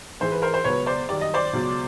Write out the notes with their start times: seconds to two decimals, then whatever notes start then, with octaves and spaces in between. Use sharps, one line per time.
0.20 G#2 E3 G#3 C5
0.32 B4
0.42 A#4 C5
0.54 C5
0.64 C#2 B2 F#3 B4 C#5
0.86 C5 D5
1.09 F#2 D#3 G3 D5
1.21 D#5
1.34 C5 D5
1.53 C#2 B2 F#3